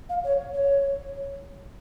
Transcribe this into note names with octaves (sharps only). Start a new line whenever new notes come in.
F5
C#5
C#5